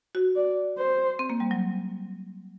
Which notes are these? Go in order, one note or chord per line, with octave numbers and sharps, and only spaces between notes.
F#4
D5
C5
C4
A#3
G3
F#3